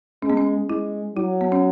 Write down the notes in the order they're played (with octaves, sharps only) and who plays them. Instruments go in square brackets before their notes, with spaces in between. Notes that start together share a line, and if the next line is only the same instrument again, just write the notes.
[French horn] G#3 [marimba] C#4
[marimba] B3
C#4
[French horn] G#3 [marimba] E4
[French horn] F#3 [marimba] E4
[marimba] B3
C#4